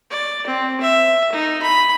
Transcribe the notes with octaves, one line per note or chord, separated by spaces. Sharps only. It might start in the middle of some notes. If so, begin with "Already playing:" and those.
D5
C4
E5
D#4
B5